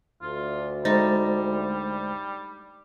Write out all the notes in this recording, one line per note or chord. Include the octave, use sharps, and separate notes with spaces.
D2 F4
G3 G#3 D#4 C5 A6